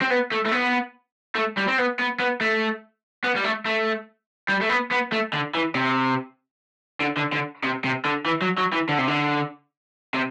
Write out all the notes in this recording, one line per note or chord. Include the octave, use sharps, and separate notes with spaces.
C4
B3
A3
A3
B3
A3
G3
C4
B3
B3
B3
A3
B3
G3
A3
A3
G3
A3
B3
B3
A3
D3
E3
C3
D3
D3
D3
C3
C3
D3
E3
F#3
F#3
E3
D3
C3
D3
C3